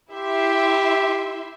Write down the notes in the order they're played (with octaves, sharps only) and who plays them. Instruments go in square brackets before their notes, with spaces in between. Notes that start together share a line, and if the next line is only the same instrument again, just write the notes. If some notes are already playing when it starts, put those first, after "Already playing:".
[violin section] E4 E5 C6 [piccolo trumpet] G4